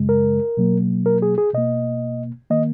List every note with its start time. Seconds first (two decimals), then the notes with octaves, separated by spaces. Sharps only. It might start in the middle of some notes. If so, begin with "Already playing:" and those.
Already playing: F#2 C#3 G#3
0.09 A#4
0.57 B2 F#3 A#3
1.06 A#4
1.22 G#4
1.38 G#4
1.53 B2 A#3 D#5
2.50 D#3 A#3 D#5